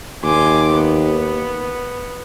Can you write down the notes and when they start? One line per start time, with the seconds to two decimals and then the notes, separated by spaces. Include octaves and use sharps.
0.24 D#2 G#5 C6 D6
0.75 B3